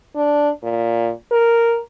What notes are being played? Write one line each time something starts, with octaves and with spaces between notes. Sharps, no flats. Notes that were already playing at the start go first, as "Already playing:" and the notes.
D4
A#2
A#4